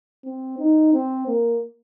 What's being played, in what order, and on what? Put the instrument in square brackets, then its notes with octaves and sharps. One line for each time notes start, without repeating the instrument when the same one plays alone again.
[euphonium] C4
D#4
C4
A#3